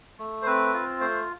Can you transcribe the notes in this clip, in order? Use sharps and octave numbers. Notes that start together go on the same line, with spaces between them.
A3
C5
C4 B4
F4
A3 C5